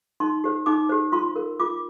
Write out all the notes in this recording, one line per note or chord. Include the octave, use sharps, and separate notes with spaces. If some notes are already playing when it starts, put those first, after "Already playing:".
D#4 C6
G4 C5
D#4 D6
G4 C5
F4 C6
A#4
F4 D6